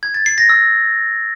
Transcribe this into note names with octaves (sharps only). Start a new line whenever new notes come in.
G#6
A6
C7
A#6
E6